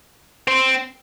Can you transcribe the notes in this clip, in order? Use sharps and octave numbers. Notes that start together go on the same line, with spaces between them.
C4